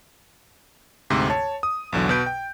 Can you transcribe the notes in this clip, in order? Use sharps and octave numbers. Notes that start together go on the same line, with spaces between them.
D2 G#2 C3
C#5 A5
D#6
B1 E2 D3 F#3
B2 B4 G6 D7
G5